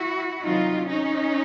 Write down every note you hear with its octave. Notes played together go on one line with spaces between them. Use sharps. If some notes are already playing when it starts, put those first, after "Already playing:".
Already playing: E4 F#4
C3 D#3 F#3 D#4 F4
C#4 D#4